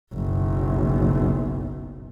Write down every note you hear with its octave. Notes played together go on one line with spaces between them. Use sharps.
F#1 B1